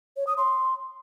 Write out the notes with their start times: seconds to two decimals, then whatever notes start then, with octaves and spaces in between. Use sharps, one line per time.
0.17 C#5
0.27 D#6
0.37 C6